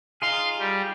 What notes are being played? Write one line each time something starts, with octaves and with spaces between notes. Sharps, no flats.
D#4 F4 G#4 F5 C6
G3